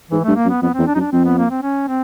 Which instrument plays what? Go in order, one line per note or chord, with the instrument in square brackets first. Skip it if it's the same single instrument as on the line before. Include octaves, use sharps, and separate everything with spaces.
[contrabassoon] G#2 [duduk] E3
[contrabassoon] G2 [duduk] A3
[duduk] A#3
[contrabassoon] F#2
[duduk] B3
[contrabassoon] F2 [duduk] B3
[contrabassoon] E2 [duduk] C4
[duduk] D4
[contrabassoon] F#2 [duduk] D#4
[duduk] D4
[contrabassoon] F2 [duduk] C4
[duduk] B3
A#3
C4
C#4
C4